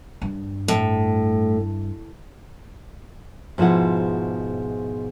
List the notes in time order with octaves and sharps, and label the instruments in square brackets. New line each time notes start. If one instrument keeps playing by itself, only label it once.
[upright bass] G2
[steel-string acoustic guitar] A2
[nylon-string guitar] G#2 B2 F3 E4 G#4 F#5